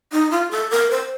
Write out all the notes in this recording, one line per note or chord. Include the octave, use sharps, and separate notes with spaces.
D#4
F4
A4
A#4
C5